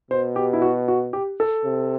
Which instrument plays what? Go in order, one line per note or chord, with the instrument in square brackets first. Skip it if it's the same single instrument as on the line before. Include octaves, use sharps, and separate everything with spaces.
[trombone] B2 [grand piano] C5
[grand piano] G4
E4
F#4
F#4
G4
A4
[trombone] C3